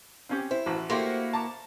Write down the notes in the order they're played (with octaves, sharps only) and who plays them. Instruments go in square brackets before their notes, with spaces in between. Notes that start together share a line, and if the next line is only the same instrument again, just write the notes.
[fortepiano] C4 C#4 G4
[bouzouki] E4 [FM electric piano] C5
[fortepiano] A1 F#4
[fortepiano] A3 G4 C6 [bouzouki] A#3 E4 F#4
[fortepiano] A5 A#5 D6